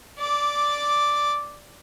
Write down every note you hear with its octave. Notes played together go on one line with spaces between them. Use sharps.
D5 D6